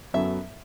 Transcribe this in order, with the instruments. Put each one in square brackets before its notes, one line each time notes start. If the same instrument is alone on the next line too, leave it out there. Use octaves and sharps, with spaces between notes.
[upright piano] F#2 F#3 B3 A4 [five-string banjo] E5